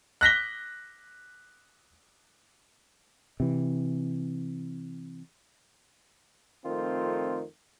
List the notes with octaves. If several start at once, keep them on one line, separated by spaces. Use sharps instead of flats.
F#6 A#6 B6 G7
C3 E3
F2 D#3 A3 C4 F4